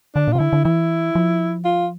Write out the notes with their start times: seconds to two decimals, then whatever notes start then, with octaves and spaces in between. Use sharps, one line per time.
0.15 D3 D4
0.28 A#2 F4
0.35 C3
0.39 D3 E4
0.53 D3
0.64 E3 E4
1.15 F3
1.65 F4